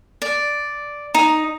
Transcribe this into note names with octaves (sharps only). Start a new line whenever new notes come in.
D5
D#4